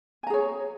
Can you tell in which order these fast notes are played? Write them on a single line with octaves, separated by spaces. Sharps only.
G#5 A#5 G#4 C#5